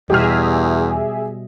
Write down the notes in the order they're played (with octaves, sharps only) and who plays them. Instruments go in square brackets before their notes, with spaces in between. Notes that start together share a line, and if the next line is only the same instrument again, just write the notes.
[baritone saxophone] E2 [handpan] B2 G3 D#5 [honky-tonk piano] G4 F6 [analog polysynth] G#4 E5